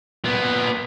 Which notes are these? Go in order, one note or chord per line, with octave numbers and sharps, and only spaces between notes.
A#2 B3